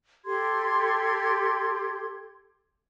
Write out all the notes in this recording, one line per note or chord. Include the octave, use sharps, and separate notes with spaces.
G4 A4 C6 G#6